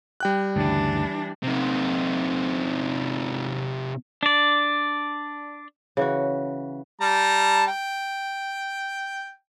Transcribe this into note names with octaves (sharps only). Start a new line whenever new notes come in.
G3 G5 F#6
D2 G2 C#3 E3 D4
C3 D#4
D4 D5
C#3 E3 F#4
G3 A5 A#5
G5